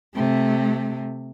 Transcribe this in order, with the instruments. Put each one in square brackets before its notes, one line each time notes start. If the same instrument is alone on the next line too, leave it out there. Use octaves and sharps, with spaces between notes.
[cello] C3 A3